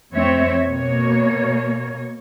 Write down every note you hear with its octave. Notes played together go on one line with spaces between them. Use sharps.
F2 A3 C4 C#5 E5
B2 A#3 C#5